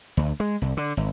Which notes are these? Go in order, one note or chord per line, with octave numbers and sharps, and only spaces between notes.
D2
G#3
C2
D3
G#1